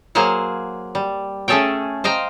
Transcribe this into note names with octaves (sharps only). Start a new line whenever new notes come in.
F#3 A#3 G#4 C5 F5 F#5
G3
A3 C#4 G#4 A4 C#5 G5
C5 D#5 F5 G5 A#5